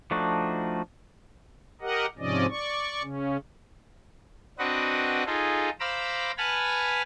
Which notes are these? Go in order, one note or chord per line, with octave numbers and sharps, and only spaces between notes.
F3 A3 D4 D#4 F#4
G4 A#4 D#5 F#5
G#2 C3 F3 C#4 D5 D#5
D5 C#6
C#3 C#4
C4 D4 F#4 B4 D#5 F#5
D#4 F4 G#4 A4
C5 F5 A#5 B5 D6 E6
B4 F#5 G#5 A5 B5 F6